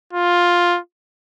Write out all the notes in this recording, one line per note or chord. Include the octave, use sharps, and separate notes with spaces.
F4